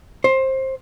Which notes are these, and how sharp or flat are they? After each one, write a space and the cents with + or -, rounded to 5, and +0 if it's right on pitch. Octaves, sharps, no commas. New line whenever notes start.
C5 +20